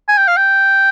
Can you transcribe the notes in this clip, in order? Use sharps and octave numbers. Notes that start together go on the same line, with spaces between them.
G#5
G5
F5
G5